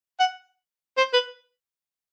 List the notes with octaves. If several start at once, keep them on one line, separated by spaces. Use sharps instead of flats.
F#5
C5
B4